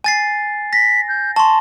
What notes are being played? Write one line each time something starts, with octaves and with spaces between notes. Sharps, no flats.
G#5 A6 C7
A#6 B6
G6
A5 C6 C#6